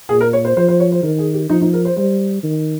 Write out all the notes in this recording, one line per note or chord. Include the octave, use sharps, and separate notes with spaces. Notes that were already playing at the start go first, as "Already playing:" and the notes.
A#2 G#4
A#4
C#5
C5
F3 C5
C5
C#5
C5
D#3 A#4
G#4
G4
F3 D#4
D#4
A#4
C5
G3 C5
D#3